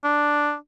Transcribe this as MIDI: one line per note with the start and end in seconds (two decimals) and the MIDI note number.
0.04 0.55 62